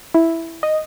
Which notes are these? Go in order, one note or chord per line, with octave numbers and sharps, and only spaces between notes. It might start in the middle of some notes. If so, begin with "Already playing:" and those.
E4
D#5